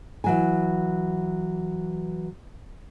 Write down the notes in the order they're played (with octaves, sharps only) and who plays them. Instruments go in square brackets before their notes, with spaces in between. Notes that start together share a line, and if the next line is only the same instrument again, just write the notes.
[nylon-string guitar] E3 F#3 G#5